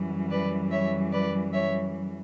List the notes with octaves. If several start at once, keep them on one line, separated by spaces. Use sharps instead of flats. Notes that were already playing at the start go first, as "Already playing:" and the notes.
Already playing: F#2 E3 G3
B4 D5
C#5 E5
B4 D5
C#5 E5